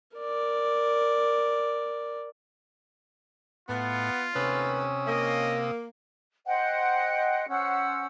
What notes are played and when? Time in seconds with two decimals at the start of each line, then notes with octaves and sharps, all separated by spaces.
0.17 A#4 D5
3.69 A2 B3 F4
4.35 D#2 C3 A3 C#4 B4 D#6 E6
5.07 A#3 D#5
6.46 C5 D#5 F#5 G5
7.49 C#4 C5 F#5 E6